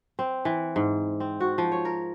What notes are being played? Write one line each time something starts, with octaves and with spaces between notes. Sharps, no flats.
C4
E3
G#2
C4
F#4
F3
C#5
A#4